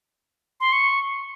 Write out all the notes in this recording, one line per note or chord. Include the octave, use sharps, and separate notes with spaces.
C6
C#6